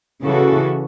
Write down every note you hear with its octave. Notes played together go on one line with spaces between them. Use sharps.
C#3 E3 C#4 F#4 A4